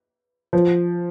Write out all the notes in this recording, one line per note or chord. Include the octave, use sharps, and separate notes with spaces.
F3